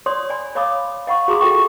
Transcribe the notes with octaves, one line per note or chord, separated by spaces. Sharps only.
C#5 D5 C6 D#6
D5 G#5 B5
C#5 D#5 F5 B5 D6 D#6
D#5 F5 F#5 B5 C#6
F#4 G#4 A#5 C6 D6 D#6
F4 A4 D#5 G5 C#6